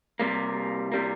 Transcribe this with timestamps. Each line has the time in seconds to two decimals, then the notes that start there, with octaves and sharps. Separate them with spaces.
0.20 C3 G3 A#3
0.92 C3 G3 A#3